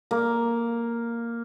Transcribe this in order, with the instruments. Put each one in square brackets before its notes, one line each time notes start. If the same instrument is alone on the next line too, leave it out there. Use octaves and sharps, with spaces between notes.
[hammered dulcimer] A#3